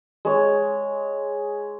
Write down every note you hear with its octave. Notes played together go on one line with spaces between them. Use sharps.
G#3 C#5